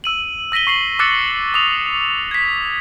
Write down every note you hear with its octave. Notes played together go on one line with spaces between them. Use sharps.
E6 D#7 F#7
E6 A#6 B6 D#7 G7
C#6 C7 F#7 G7
D6 E6 F#6 A6 C#7
D6 D#6 F7
G#6 B6